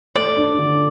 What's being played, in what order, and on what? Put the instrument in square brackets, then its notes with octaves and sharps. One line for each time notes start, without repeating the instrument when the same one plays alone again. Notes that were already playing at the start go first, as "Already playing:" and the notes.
[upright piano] A3 [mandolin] D5
[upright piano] D4
D3